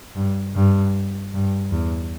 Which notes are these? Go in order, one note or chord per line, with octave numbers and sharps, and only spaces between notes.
G2
G2
G2
E2